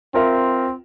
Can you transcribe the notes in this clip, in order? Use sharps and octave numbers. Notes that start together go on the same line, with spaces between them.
C4 F4 A#4 E5